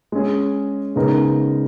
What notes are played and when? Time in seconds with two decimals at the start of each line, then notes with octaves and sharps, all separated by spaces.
0.12 G#3 C#4 G#4
0.96 C#3 G#3 B3 D#4 A#4